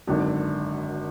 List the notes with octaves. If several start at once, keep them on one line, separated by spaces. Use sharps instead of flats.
G#1 F#2 D3